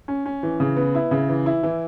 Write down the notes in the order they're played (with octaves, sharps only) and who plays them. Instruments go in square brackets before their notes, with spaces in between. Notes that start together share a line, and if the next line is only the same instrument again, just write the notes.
[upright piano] C#4
C#4
E3
C#3
B3
E4
C#3
E3
E4
E3